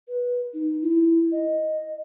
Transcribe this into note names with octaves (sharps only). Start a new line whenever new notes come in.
B4
D#4
E4
D#5